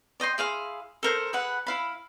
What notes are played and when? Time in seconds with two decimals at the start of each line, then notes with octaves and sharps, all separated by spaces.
0.20 D5 D#5 G5 C6
0.38 E4 G#4 F5 C6
1.03 A4 A#4 C5
1.33 G#4 B4 F#5
1.67 E4 F5 B5